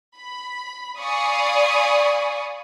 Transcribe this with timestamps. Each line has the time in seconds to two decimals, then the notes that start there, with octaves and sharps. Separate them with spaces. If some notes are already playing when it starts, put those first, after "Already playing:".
0.18 B5
1.00 D5 F5 G#5 B5 C#6 D#6